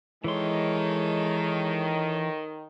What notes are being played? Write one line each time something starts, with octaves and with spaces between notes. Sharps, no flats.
D#3 E3 G#3 A4 C#5 C6